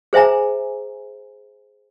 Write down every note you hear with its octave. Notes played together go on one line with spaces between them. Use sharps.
G#4 C5 E5 G#5 A#5